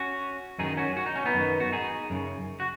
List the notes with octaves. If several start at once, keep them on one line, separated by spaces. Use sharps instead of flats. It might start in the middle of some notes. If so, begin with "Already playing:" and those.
Already playing: C#4 F#4
F#2 D#3 D#4 G#4
C#4 F#4
F#4
D#4
C#4
B3 D#4
F#2 D#3
F#4
D#4 G#4
F#2 C#3
F#4